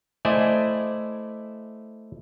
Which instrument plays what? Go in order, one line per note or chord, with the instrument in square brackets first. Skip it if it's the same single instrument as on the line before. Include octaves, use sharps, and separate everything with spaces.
[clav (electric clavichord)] A3 E4 C5 D5 D#5 G#5